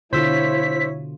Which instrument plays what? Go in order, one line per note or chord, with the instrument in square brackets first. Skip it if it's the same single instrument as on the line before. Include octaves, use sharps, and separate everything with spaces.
[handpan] B2 D3 F4 [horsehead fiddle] E4 C#5 [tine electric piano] C5 E6 [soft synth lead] B6